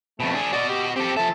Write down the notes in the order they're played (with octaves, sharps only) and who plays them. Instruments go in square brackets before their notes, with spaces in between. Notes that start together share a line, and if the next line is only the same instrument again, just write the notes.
[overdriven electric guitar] F2 B2 [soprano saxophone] A3
[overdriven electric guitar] D4 G#4
[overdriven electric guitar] F#4 D#5 [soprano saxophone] D5
[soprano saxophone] G4
[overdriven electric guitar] C4 A4 [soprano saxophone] G4
[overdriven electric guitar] F3 E5 [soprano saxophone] A4